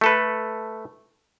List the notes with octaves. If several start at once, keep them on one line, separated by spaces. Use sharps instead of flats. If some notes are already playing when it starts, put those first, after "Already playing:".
A3 A4 B4